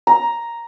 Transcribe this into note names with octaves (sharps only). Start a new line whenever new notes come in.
A#5